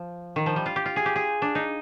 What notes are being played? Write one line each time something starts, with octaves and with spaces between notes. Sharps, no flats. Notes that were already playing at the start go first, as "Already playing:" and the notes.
Already playing: F3
D#3
F3
G3
F4
G4
F4
G#4
G4
G#4
D4
D#4